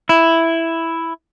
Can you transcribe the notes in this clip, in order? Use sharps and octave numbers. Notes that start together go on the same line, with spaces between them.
E4